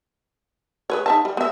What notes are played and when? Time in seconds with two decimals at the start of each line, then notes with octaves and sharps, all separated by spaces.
0.90 G#4 B4 C#5
1.06 D#4 E5 A5
1.25 G3
1.37 B3 E5